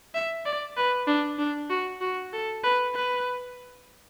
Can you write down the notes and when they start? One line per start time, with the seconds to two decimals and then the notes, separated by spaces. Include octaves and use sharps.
0.15 E5
0.46 D5
0.77 B4
1.07 D4
1.38 D4
1.70 F#4
2.01 F#4
2.33 A4
2.63 B4
2.95 B4